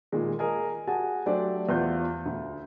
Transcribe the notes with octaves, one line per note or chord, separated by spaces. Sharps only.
A#2 D#3 G#3
G#4 A#4 D#5 G#5
F#4 G#4 G#5 A5
F#3 A3 D4 G4 C5 D5
E2 F4 G6
D2